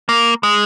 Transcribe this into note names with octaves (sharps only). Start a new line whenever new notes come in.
A#3
G#3